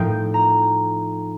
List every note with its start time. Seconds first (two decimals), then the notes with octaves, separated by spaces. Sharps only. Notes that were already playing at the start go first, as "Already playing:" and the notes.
Already playing: A2 F3 C4 D#4 G5
0.34 A#5